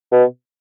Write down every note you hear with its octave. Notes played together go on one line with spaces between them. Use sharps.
B2